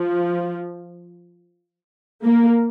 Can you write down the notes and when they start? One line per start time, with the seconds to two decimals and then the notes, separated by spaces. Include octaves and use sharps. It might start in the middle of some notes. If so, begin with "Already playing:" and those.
Already playing: F3
2.22 A#3